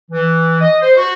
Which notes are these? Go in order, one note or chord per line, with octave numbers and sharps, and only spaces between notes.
E3
D#5
C5
F#4